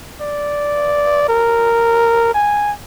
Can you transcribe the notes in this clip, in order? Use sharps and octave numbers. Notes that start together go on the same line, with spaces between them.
D5
A#4
G#5